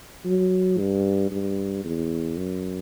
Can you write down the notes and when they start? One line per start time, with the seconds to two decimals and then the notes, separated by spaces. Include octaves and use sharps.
0.25 F#3
0.78 G2
1.31 G2
1.84 E2
2.37 F#2